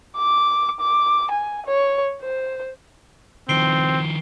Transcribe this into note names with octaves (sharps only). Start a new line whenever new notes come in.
D6
D6
G#5
C#5
C5
D#3 F3 C4 C7 D7 G7